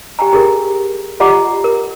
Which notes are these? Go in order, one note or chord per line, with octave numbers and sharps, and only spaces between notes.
G4 G5 G#5 A#5
G4 G#4 A#4
F4 G4 D#5 F#5 A#5 D6
A#4